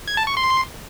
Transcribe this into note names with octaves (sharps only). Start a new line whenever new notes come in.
G#6
A5
C#6
C6